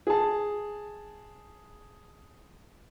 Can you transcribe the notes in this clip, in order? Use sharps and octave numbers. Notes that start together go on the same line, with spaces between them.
G#4 A5